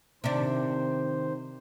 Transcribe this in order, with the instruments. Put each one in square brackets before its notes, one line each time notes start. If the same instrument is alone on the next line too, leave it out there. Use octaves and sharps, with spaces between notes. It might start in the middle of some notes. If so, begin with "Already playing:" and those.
[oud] C3 D4 [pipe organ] D#3 C5